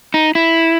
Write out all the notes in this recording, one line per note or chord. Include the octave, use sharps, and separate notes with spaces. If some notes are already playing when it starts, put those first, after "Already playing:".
D#4
E4